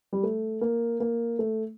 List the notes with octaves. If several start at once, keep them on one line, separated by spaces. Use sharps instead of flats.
G3
A3
A#3
A#3
A3